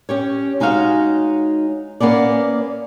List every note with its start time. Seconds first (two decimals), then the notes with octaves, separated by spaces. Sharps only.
0.09 C#4 G4 C#5
0.60 G#3 D#4 F#4 C#5 F5
2.00 A#3 B3 C#4 D5